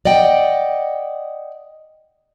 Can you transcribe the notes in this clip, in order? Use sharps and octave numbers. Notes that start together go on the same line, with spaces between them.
D5 D#5 F#5 G5